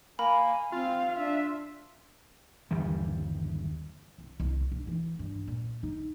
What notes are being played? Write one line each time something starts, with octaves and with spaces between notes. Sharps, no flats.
A#3 G#5 B5
C4 F4 F5
D4 E5
G1 D#2 E3 G3
C2
C2
G2
E3
G2
A#2
D#4